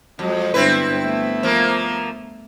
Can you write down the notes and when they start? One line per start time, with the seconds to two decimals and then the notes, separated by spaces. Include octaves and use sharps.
0.19 F2 F#3 G#3
0.54 G2 D3 B3 C4 E4 B4
1.05 A3 B3
1.43 F3 A#3